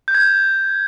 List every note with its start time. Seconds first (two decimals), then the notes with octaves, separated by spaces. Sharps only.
0.08 G6
0.15 G#6
0.21 G6